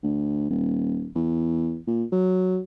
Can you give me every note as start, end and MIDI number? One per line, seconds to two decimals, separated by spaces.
0.03 0.47 38
0.50 1.09 27
1.15 1.79 40
1.87 2.04 46
2.12 2.59 54